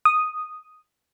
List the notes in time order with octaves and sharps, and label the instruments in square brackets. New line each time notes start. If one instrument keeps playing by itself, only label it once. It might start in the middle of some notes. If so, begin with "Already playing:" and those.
[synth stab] D#6